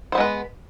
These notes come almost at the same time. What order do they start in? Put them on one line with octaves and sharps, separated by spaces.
C5 B3 G#3 B4